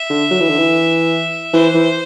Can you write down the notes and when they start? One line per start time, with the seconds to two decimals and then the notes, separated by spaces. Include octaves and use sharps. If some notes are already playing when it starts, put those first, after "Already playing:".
Already playing: E5
0.10 D3
0.31 F#3
0.40 E3
0.49 D3
0.59 E3
1.54 E3 C5
1.74 E3